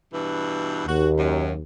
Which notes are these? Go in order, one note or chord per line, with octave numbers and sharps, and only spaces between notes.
G2 B2 E3
D#2 F#4
F#2